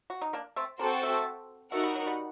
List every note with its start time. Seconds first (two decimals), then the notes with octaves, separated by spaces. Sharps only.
0.10 F#4
0.22 D#4
0.33 A#3 D4
0.56 A3 C4
0.79 A#3 C4 F#4 A4 C5 G5
1.03 A3
1.72 A3 D#4 F#4 A#4 F#5
1.83 G3
1.95 F#3
2.07 G3